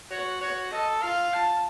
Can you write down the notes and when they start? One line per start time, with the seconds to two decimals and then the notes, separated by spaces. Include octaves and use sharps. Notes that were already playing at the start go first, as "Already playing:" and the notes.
0.10 F#4 C#5
0.41 F#4 C#5
0.71 A4 D#5
1.02 F4 F5
1.34 A5